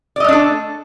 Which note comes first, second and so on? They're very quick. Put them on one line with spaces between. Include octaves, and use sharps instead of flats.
D5 D#5 A3 D4 A4